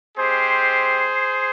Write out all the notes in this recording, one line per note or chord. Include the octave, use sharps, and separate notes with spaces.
G#3 C4 G4 G#4 C5